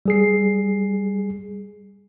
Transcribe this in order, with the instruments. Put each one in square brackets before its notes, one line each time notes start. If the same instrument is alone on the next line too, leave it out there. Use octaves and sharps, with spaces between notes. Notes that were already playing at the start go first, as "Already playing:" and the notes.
[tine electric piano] G3 G#4 C7